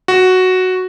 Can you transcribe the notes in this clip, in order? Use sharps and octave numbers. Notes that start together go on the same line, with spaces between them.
F#4